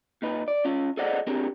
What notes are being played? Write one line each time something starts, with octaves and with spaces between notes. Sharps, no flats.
A#2 D#4 B4
D5
C#4 F4
G#4 A4 C5 D5 D#5 F#5
C4 D4 G4 G#4 A#4